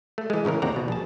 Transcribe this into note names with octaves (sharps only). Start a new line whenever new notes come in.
A3
E3 G#3
A2 C#3 E3 A#4
D#2 C3 C4 D5 F#5 A#5
B2
A#1 G#4 A5